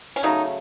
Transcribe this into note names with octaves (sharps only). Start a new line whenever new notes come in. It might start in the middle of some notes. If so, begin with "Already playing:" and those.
C#4
C#3 F#3 A3 D#4